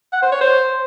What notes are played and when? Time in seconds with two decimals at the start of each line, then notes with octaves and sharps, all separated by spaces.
0.13 F#5
0.22 C5
0.32 C#5
0.41 C5